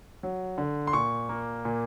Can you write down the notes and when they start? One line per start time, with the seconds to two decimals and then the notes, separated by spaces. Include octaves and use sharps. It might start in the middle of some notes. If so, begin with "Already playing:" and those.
0.23 F#3
0.58 D3
0.87 C6
0.93 A#2 C#6
1.29 A#3
1.65 A#2